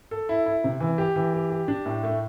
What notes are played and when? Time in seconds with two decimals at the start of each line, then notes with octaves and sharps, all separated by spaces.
0.11 A4
0.29 E4
0.46 E4
0.64 C3
0.80 E3
0.98 G4
1.16 E3
1.34 G4
1.50 G4
1.68 D4
1.86 A2
2.03 A3